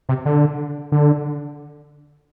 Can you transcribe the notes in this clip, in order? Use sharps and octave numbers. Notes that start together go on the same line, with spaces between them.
C3
D3
D3